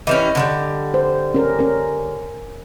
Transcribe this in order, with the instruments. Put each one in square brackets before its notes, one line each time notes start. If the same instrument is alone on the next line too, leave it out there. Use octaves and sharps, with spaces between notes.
[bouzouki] E3 G3 C#4 [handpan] D#5
[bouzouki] D3 F3 G3
[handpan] C5
C#4 A#4
C#4 A#4